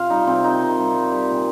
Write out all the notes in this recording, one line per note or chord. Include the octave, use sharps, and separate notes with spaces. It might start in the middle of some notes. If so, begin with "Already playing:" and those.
Already playing: C3 F4 F5
G3 D#4
C3 C4
D#3 D#4
C3
G3
G3
G3
A#2